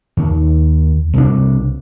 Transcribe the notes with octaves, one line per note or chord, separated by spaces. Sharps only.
D#2
C2 D4